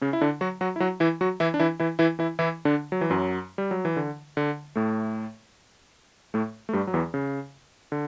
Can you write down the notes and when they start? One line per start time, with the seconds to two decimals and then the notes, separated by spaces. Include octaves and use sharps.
0.01 C#3 C#4
0.13 E4
0.21 D3 D4
0.41 F#3 F#4
0.61 F#3 F#4
0.76 E4
0.80 F#3 F#4
1.00 E3 E4
1.21 F#3 F#4
1.40 E3 E4
1.54 D4
1.60 E3 E4
1.80 E3 E4
1.99 E3 E4
2.19 E3 E4
2.39 E3 E4
2.65 D3 D4
2.92 F#3
3.01 E3
3.10 F#2 F#3
3.58 G3
3.71 F#3
3.85 E3
3.97 D3
4.37 D3
4.76 A2 A3
6.34 A2 A3
6.69 A3
6.73 G2 G3
6.87 F#3
6.94 E2 E3
7.14 C#3
7.92 D3